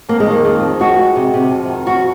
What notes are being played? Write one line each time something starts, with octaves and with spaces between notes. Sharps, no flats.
F2 A#3
G#3
D#3 A#3
F2 C4
F2
G#3 F#4
G#3
C3
C3
F2
D#3
F2 F#4